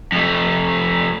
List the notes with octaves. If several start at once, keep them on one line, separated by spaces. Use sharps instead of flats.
F2 A3